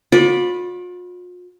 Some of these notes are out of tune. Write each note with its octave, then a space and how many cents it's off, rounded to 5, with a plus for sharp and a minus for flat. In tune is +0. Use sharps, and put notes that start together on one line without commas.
F4 +45 D5 +0 B5 +0